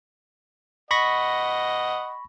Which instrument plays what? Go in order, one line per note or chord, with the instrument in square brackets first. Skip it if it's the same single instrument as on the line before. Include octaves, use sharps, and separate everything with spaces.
[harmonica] D#5 F#5 [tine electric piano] B5 C#6 A#6